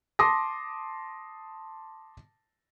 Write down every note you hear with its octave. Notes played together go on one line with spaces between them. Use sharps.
A5 C6 D6 D#6 A#6